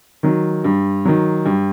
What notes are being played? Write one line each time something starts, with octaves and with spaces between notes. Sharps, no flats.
D#3 F#3
G2
D#3 F#3
G2